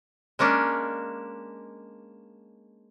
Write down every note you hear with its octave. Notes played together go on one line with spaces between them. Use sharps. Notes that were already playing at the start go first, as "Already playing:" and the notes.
G#3 A#3 C#4 D4